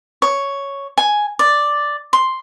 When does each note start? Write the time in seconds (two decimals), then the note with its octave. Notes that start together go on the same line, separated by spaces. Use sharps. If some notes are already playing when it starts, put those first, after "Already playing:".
0.22 C#5
0.98 G#5
1.39 D5
2.13 C6